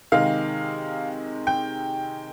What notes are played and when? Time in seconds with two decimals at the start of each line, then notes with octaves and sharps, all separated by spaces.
0.12 C3 D#3 G#3 F5
1.47 G5